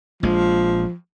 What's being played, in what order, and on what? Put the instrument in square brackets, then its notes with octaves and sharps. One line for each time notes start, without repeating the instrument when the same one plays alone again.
[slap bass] A#1 G#3 [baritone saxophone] F3